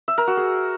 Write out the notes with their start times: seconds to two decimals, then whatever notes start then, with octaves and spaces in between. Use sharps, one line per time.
0.08 E5
0.18 A#4
0.27 F#4
0.37 G#4